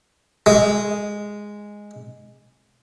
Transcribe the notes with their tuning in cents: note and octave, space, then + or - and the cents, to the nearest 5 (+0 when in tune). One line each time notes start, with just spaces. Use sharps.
G#3 -5